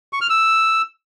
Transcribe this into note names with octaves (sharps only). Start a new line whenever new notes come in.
C#6
F6
E6